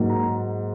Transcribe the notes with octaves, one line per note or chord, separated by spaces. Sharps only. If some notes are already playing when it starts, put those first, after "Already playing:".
Already playing: G#2 F#3 A#3
A#5